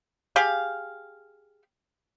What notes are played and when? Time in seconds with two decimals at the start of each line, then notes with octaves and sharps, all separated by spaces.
0.36 G4 G#4 F5